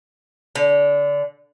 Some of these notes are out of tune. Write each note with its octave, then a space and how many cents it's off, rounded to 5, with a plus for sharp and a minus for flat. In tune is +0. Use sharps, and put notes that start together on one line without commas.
D3 -25